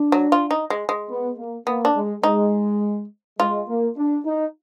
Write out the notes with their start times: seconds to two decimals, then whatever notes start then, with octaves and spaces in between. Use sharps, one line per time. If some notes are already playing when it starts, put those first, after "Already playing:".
Already playing: D4
0.12 F#3
0.32 F4
0.51 D#4
0.70 G#3
0.89 G#3
1.09 B3
1.37 A#3
1.67 A#3 B3
1.85 D4
1.95 G#3
2.23 G#3 D#4
3.39 G#3 F4
3.68 A#3
3.97 D4
4.25 D#4